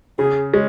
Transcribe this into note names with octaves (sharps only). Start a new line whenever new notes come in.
C#3 G#4
G#3 C#4